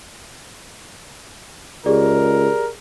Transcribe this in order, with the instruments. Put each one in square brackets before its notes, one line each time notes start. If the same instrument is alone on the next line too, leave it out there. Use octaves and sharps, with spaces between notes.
[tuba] C#2 [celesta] G4 G#4 D5 [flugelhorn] A#4